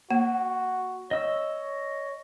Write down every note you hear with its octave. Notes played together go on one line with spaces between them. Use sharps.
A#3 F#4
C#5 D#5 E6